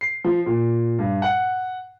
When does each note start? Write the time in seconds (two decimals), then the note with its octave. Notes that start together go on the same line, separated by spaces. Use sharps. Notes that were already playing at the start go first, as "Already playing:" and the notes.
0.01 C7
0.24 F3
0.46 A#2
0.99 G2
1.22 F#5